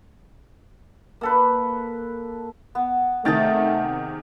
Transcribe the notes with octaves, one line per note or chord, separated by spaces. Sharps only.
A#3 A4 B4
B3
C3 D#3 A3 G#4 G5 A6